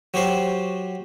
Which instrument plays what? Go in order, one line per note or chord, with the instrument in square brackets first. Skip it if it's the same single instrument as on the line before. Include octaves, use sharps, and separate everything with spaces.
[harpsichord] F#3 F#4 G4 C5 C#6